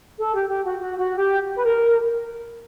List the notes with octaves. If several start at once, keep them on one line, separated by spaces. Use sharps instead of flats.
A4
G4
G4
F#4
F#4
F#4
G4
B4
A#4